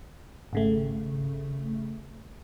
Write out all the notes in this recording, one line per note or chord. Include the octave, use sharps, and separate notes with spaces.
G#1 C#3 A3